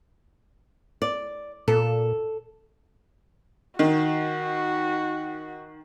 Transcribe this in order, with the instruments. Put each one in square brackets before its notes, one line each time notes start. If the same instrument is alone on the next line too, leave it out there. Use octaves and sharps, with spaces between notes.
[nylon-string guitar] D5
[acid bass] A#2 [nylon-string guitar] A4
[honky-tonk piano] D#3 [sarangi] F#4